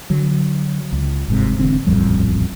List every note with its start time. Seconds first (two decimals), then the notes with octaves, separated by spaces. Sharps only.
0.10 D3 F#3
0.93 C#2
1.28 G1 G#2 C3
1.58 E1 E2 D3 C4
1.86 D#1 A1 F2 G3